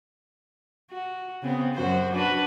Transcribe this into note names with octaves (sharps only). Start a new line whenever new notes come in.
F#4
C#3 B3 C4
F#2 F#4 C5
D4 F#4 B4